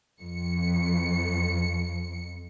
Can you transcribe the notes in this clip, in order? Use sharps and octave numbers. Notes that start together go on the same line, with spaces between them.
F2 C#7